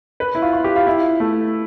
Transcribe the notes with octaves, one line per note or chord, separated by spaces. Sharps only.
B4
E4
F4
F4
G4
F4
E4
A3